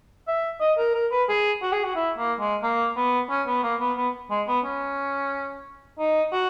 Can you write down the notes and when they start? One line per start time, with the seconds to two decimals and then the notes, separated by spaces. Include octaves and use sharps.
0.28 E5
0.61 D#5
0.78 A#4
0.95 A#4
1.12 B4
1.29 G#4
1.63 F#4
1.73 G#4
1.84 F#4
1.95 E4
2.18 A#3
2.40 G#3
2.63 A#3
2.96 B3
3.30 C#4
3.47 B3
3.63 A#3
3.80 B3
3.97 B3
4.30 G#3
4.47 B3
4.65 C#4
5.99 D#4
6.32 F#4